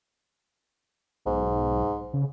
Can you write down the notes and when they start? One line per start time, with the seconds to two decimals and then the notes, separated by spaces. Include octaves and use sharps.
1.26 B1 G#2
2.13 C#3